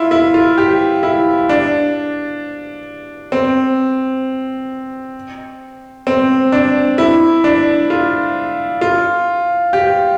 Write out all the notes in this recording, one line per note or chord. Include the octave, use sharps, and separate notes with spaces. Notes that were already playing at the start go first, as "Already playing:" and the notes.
Already playing: E4 F4
E4
F4
G4
E4
D4
C4
C4
D4
E4
D4
F4
F4
G4